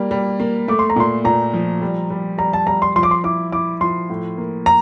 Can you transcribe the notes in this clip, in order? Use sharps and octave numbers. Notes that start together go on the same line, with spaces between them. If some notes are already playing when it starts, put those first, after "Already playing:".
Already playing: G3 A#3
G3
A#3
A3 D6
C6
A#5
A#2 C6
A#2 A#5
F3
G3
G3
G3 A#5
A5
G3 A#5
C6
F3 C6
D6
C6
E4 D6
E4 D6
F3 C6
A2
A#3
A#5